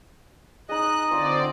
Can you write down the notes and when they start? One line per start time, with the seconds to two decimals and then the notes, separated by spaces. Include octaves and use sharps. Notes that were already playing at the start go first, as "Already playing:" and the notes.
0.69 D#4 G#4 D#5 F#6
1.11 D3 C4 F4 C5 D5